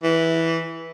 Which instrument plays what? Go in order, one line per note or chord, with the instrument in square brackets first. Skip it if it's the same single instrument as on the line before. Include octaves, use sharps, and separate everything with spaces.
[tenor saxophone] E3